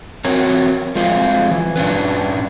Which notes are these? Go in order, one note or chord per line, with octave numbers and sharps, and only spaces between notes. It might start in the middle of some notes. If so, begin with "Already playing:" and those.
C4 F#4 A#4 C#5
F3 G#3 C4 F4
E3
G2 C#4 D4 B4